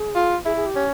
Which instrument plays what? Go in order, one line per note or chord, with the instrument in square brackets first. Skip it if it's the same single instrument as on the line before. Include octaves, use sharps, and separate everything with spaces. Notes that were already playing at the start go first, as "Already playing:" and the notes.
Already playing: [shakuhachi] G#4
[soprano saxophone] F4
[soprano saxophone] E4 [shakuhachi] G#4
[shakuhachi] G#4
G4
[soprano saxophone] C#4